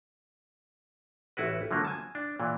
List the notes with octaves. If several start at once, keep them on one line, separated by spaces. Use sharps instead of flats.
A1 E4 F#4 B4
D3 F3 F#3 A#3
G#5 A5
D4
A#2 E3